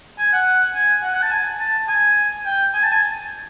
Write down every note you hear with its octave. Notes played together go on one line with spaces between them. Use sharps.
G#5
F#5
G#5
F#5
F#5
A5
G#5
A5
G#5
G5
G#5
A5
G#5